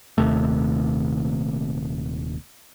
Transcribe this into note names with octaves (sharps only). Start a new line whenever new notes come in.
D#1 D#2 C3 A3